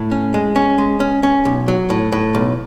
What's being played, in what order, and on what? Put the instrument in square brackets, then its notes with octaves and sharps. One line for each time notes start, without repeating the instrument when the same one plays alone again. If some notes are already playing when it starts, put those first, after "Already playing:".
Already playing: [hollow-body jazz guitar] A2
C#4
G#3
C#4
G#3
C#4
C#4
B1
F#3
A2
A2
B1